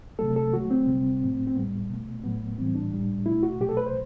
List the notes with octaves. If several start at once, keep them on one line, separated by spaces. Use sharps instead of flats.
C3 F#3 A3 A4
A4
D3 F#3 A3 F#4
C4
C3 G3
A2 F#3 A3
C4
A2 G3 B3
B2 A3
A2 F#3 A3 B3
A2 E3 G3 C4
D4
A2 G3
B2 A3 E4
F#4
B2 F#3 A3 G4
A4
B4
C5